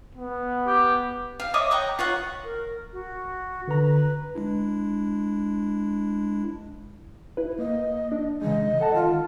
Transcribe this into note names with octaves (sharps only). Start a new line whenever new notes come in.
B3
G4
F5
C#5 D#5 E5 D6
C#5 F#5 G5 A#5
F4 C#5 F#5
A#4
F#4
D3 B4 A#5
G#3 D4 E4
E4 B4
A#3 D#5
D4
C#3 E3 G#3 D#5
A4 F#5 A5
D#3 F4